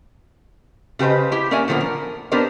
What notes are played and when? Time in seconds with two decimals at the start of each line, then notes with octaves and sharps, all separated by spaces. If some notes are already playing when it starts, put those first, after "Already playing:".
0.99 C#3 G4 B4 C5 D#5
1.31 E4 G4
1.51 A#3 C#4 A#4 D5 E5 G#5
1.68 A#2 D3 F3 A#3 B3
1.81 A#4
2.32 B3 D4 G4 A#4 C5 D5